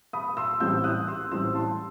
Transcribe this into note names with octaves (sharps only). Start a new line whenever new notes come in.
B5 D#6
C6 E6
A1 A2 G3 C4 E6 G6
D#6 F#6
C6 E6
A1 A2 G3 C4 C6 E6
A5 C6